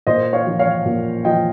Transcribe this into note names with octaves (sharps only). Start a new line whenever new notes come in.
A#2 C5 D#5
C#5 F5
F3
C#5 F5
A#2
F3 D#5 G5